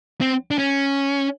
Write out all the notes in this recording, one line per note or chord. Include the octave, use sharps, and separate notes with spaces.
C4
D4
C#4